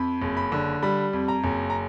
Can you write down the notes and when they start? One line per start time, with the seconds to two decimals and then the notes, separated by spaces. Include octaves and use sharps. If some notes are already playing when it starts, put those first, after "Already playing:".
Already playing: F2 B5
0.22 F#1
0.37 B5
0.52 D3
0.83 G3 B5
1.13 F2
1.28 A#5
1.44 F#1
1.70 A#5